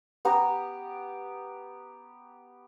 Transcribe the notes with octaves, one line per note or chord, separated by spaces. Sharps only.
B3 G4 A#5